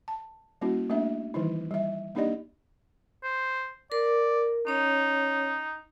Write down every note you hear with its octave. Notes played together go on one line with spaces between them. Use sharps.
A5
G3 A#3 C#4 E4 F#4
A3 A#3 C4 D4 E5
D#3 E3 G3 D#4 E4
G3 E5
A#3 D4 D#4 G4 D5 D#5
C5
A#4 D5
C#4 D#4 C#5